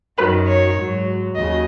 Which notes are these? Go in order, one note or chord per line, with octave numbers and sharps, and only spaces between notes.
F#2 D#3 F#3 B4
C#5
G#2 F#3
D#2 C#3 F#3 D#5